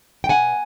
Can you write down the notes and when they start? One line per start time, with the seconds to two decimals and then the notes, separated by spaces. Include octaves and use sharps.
0.24 G5
0.29 B2 F#5 G#5